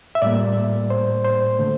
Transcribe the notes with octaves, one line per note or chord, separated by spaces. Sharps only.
E5
A2 G3 A#3 D5
C5
C5
D3 A3